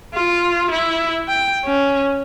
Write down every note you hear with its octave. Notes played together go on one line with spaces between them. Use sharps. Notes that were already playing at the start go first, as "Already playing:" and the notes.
F4
E4
G5
C#4